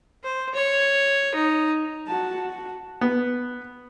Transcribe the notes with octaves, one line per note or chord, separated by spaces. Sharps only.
C5
C#5
D#4
F#4 A5
F#4
B3